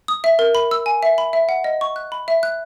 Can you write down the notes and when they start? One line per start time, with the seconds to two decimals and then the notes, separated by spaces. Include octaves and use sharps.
0.08 D#6
0.24 E5
0.39 A#4
0.55 B5
0.71 E6
0.86 G#5
1.03 E5
1.18 B5
1.33 E5
1.49 F#5
1.64 D#5
1.81 C#6
1.96 F#6
2.12 B5
2.28 E5
2.43 F#6